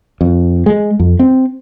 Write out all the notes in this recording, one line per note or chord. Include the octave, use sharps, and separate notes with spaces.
F2
G#3
F2
C4